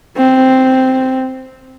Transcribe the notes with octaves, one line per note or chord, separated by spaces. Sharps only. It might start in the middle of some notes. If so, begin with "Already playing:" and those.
C4